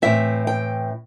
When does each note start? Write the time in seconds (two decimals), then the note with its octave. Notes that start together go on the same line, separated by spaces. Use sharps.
0.02 A2 E3 C4 E5
0.47 G5